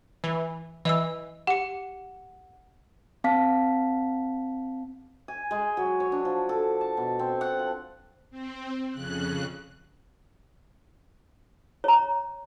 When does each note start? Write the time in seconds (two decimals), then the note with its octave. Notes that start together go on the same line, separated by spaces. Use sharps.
0.24 E3
0.85 E3 D#5 E6
1.47 G4 F#5 C#7
3.24 C4 F5 A5 B6
5.28 G#5
5.51 G#3
5.77 F#3
6.00 C#5
6.12 D4
6.25 F3
6.49 A4
6.81 A5
6.97 B2
7.19 C4
7.41 F#5
7.59 F3
8.31 C4
8.92 F2 C#3 F#6
11.84 C#5 A#5